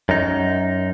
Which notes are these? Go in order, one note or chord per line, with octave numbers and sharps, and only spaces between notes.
F#2 D#4